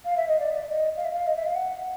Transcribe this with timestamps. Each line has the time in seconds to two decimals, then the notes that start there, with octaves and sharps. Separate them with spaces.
0.05 F5
0.17 E5
0.28 D#5
0.39 D5
0.55 D5
0.69 D#5
0.96 F5
1.04 E5
1.12 F5
1.27 D#5
1.36 E5
1.46 F5
1.55 F#5